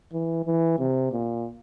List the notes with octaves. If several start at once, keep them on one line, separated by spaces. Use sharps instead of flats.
E3
E3
C3
A#2